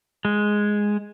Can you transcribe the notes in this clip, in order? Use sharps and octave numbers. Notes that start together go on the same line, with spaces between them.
G#3